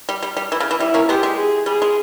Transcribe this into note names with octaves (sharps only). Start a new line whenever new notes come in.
G3
G3
G3
E3
C#3
E3
G3 E4
A#3 C#4
G#3 B3 G4
G#3
G#4
G3 G#4
G#3